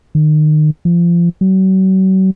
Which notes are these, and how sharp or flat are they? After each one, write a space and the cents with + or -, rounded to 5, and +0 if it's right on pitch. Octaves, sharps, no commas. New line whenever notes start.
D#3 -30
F3 -25
F#3 +40